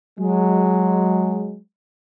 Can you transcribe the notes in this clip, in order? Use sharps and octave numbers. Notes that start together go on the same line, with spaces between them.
F#3 G#3